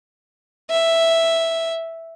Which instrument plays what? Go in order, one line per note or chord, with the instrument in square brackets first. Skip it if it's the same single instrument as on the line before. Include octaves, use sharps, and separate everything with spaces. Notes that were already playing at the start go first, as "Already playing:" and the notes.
[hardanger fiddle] E5